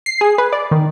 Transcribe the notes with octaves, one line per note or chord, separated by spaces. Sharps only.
C7
G#4
B4
D5
D#3